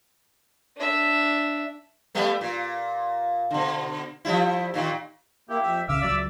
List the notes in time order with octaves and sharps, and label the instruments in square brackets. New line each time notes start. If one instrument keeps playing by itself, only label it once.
[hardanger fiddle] D4 E5
[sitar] G3 A3 B3
A#2
B2 D3
F3 G3 E4
A#2 D#3
[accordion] A#3 E4 [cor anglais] G4
[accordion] F2 E5
[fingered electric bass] C2 C#3 [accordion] E5 D6 E6 [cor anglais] F5
[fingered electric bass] C#2 F#3 [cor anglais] D5